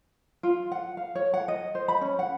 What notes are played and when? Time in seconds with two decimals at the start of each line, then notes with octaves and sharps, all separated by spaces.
0.43 F4
0.72 F#5
0.97 F5
1.15 C#5
1.34 F#5
1.48 D#5
1.75 C5
1.88 B5
2.01 C#4
2.19 F#5